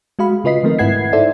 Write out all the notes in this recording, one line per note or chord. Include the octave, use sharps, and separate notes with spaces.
G#3 F#4 F5 B5
C#3 F4 B4 D#5 B6 C7
D#3 F3 A3 C4 A#4
G#2 E4 B4 F#5 G#6 C7
D#4 E4 A4 C5 D5 E5